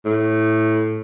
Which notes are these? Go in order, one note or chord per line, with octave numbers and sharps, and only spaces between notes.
A2